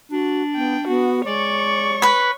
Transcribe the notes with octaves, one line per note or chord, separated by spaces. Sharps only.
D4 F#4
B3 G5
B3 F#4
G#3 C#5 D5 C#6
B4 B5